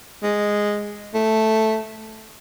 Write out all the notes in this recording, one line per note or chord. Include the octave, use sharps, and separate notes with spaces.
G#3
A3